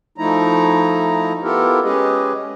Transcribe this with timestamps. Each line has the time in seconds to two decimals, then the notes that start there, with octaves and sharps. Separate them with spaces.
0.18 F3 A3 D#4 E4 A#5
1.43 B3 E4 F4 G4 A4 A#4
1.84 G#3 C#4 G4 G#4 B4 D#5